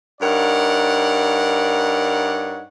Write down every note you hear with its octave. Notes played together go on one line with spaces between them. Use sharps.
G2 D#4 A#4 C#5 D5 F#5